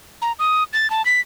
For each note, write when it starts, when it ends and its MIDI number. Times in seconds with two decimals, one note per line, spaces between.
0.22 0.32 82
0.39 0.64 87
0.73 0.90 93
0.90 1.04 81
1.05 1.20 95